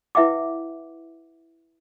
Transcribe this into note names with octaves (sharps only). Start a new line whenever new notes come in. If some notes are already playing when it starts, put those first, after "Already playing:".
E4 B4 E5 F#5 G5 D6